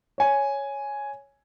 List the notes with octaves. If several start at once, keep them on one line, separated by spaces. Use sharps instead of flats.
C#5 G#5